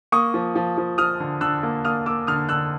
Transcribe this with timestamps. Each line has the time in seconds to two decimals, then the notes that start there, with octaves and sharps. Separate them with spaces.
0.12 A#3 C#6 D#6
0.34 F3
0.56 F3
0.78 F3
0.98 F3 D#6 F6
1.20 D3
1.41 D3 E6 F#6
1.63 A#3
1.85 A#3 D#6 F6
2.06 A#3 D6 E6
2.27 D3 D#6 F6
2.49 D3 E6 F#6